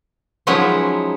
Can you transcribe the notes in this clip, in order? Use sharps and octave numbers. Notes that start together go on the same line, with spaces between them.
F3 F#3 G#3 C#4 D#4 E4